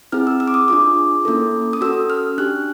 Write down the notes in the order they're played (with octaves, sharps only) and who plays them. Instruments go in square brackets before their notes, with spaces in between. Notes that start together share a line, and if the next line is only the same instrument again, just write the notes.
[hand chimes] C4 E4 G#4 F6
E6
E6
D6
D#6
D4 F4 G#4 D6
A#3 C#4 E4 A4
D#6
C#4 F#4 A4 E6
F6
D4 G4 F#6